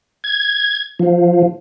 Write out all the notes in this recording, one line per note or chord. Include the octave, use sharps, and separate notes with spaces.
G#6
F3